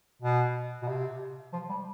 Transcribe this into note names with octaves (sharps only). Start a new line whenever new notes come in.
B2
B2
C3
F3
G3